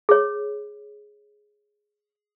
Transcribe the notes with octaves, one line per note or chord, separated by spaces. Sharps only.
G#4 C#5